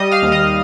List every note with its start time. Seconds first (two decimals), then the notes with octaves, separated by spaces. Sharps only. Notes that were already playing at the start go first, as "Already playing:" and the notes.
Already playing: G3 D#5 D#6
0.11 F5 F6
0.23 D#2
0.32 D#5 D#6